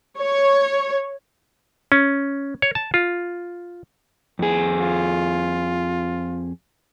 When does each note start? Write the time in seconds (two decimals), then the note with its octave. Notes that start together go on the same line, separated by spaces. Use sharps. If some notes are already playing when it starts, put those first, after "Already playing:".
0.18 C#5
1.92 C#4
2.62 C#5
2.75 A5
2.94 F4
4.39 F2 G#4
4.80 F4